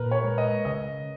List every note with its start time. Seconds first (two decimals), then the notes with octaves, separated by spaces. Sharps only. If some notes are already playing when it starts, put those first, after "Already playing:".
Already playing: A#2 A#3 A#4 B4
0.11 C#5
0.24 G#3
0.38 D#5
0.65 C#3 D#5